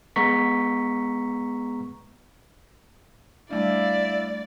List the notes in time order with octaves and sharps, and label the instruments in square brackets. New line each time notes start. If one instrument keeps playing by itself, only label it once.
[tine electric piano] G#3 B3 A#5 C#6 B6
[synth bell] G3 A3 D4 [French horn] E4 [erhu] D5 [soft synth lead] F5